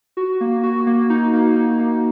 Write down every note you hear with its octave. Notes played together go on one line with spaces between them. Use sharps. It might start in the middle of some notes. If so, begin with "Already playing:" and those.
F#4
A#3
F#4
A#3
D#4
A#3
D#4
A#3